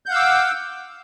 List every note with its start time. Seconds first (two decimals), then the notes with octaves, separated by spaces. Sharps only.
0.06 G6
0.08 F#5
0.11 F5
0.13 E6
0.16 D6